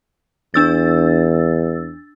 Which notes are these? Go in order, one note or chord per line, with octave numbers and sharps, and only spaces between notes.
E2 D4 E6 A6